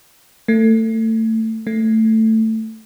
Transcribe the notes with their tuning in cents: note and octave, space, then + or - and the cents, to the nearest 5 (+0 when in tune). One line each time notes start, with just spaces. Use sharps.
A3 +25
A3 +10